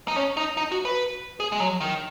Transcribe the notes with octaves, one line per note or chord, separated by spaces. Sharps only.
D#4
C#4
D#4
D#4
F#4
B4
G#4
G#3
F#3
D#3